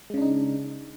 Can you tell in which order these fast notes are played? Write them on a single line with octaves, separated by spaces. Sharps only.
G#3 C#3 D4 D#4